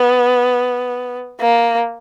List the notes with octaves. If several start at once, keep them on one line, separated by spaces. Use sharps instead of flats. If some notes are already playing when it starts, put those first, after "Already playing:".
Already playing: B3
A#3